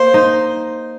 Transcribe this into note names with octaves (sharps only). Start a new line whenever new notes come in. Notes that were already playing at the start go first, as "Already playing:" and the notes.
Already playing: A#3 C5
D#4